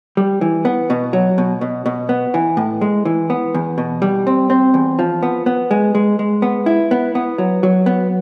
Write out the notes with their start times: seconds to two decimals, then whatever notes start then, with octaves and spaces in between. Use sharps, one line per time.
0.17 G3
0.41 E3
0.65 B3
0.90 B2
1.13 F#3
1.38 B2
1.61 B2
1.86 B2
2.09 B3
2.34 E3
2.57 A2
2.81 G#3
3.05 E3
3.30 B3
3.54 E2
3.78 B2
4.02 G3
4.27 C4
4.50 C4
4.74 E2
4.99 F3
5.23 B3
5.46 B3
5.71 G#3
5.95 G#3
6.19 G#3
6.42 B3
6.66 E4
6.91 B3
7.15 B3
7.38 F#3
7.63 F#3
7.86 B3